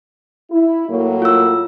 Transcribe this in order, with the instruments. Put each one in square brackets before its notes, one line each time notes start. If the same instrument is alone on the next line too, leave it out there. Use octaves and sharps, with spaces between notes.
[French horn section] E4
A2 F#3 A#3
[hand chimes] F4 E6